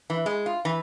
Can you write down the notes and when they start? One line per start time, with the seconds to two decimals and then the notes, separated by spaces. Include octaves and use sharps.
0.10 E3
0.26 G#3
0.46 F4
0.65 E3